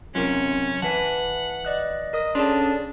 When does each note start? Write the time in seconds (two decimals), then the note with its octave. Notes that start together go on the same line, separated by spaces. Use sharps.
0.15 F#2 C3 C#4 F4 A#4
0.82 E3 B4 F#5 G#5 A5
1.65 D5 D#5 F#6
2.13 A#4 D#5 D#6
2.35 C#4 D4 G#4 A4 D5 C6